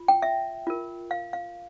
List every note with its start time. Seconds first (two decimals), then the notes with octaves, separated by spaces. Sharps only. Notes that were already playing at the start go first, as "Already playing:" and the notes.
Already playing: F4
0.08 G5
0.22 E5
0.67 F4 A#4
1.11 F5
1.33 F5